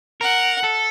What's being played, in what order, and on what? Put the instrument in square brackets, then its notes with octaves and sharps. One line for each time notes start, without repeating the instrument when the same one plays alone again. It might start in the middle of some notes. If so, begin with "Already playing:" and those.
[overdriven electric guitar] A#4 [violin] F#5
[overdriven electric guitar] A4